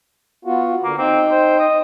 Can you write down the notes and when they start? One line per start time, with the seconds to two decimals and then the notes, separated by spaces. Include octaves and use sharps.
0.45 B3 F4 F#4
0.84 D3 A#3
0.98 C4 D#4 G5
1.31 C5
1.59 D#5